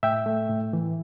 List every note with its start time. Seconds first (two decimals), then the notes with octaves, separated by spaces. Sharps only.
0.03 A2 E5 G5
0.26 A3
0.49 A2
0.73 E3